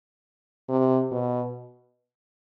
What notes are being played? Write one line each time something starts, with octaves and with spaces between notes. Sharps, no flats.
C3
B2